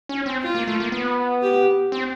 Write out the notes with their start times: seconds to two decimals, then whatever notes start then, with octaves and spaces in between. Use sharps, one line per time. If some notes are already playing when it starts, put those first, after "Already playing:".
0.09 C#4
0.26 C4
0.42 F4
0.55 A#3
0.68 A3
0.80 A#3
0.92 B3
1.43 G4
1.92 C4